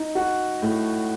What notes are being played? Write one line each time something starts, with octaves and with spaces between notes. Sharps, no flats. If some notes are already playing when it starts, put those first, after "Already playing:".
Already playing: D#4
F#4
A2